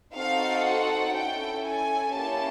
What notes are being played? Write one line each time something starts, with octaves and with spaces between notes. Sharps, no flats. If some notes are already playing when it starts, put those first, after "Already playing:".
C4 D#4 F#4 A4 F5
F#5
C#4 E4 A4 G5
G#5
A#3 C#4 E4 G4 A5